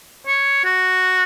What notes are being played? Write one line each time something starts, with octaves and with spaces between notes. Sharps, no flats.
C#5
F#4